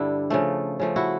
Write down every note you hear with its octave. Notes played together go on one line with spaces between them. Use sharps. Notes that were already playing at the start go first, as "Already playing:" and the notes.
Already playing: G2 D3 G3 D4 E4
C#3 F3 A3
C#3 F3 A3
E4 F#4